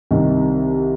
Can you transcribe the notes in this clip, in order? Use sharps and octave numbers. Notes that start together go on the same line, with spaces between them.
C2 C3 D#3